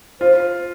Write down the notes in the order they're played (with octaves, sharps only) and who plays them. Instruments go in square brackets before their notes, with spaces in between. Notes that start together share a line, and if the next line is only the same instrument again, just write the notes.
[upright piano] F4 [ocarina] C5